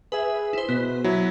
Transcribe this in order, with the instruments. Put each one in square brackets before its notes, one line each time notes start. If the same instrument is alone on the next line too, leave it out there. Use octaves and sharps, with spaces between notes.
[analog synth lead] G#4 [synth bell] B4 E5
[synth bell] E4 C5
[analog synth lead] B2 [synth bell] B3 B6
[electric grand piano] F#3 E4